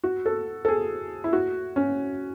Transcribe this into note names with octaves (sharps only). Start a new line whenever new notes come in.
F#4
A4
A4
G#4
E4
F#4
C#4